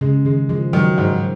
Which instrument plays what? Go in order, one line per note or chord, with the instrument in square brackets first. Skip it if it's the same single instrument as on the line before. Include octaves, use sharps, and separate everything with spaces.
[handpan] C#3 [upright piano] G#3
[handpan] D#3 [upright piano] G#3
[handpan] F3 [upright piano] G#3
[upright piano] D#3 [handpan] F#3
[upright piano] G#2